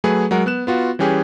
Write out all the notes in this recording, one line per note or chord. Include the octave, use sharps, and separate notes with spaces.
F#3 A3 G#4 B4
F#3 G#3 A#4 F#5
B3 F#6 E7
B3 F4 F#4
E3 G3 C#4 G4 G#4